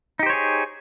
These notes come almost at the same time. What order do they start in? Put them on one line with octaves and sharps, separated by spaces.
D#4 G4 C5 C#5 G#4